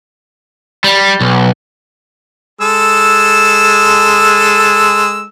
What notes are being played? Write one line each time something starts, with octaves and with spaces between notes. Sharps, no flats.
G3
B1
G#3 A4 E6